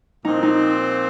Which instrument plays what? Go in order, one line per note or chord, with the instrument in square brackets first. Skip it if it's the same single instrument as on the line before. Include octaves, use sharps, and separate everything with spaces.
[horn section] A#2 F3 C4 [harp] D#4
[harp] D#4